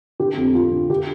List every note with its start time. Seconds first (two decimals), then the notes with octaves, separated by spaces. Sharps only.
0.19 D3 G4
0.37 F2
0.54 F2 F4
0.72 D3
0.90 D3 G4